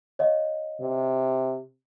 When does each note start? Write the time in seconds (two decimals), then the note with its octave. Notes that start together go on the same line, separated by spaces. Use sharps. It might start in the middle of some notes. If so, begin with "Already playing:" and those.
0.19 C#5 D#5 F5
0.81 C3